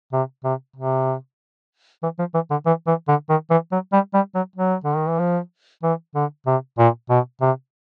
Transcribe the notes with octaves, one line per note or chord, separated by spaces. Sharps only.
C3
C3
C3
E3
F3
E3
D3
E3
E3
D3
D#3
E3
F#3
G3
G3
F#3
F#3
D3
D#3
E3
F3
E3
D3
C3
A#2
B2
C3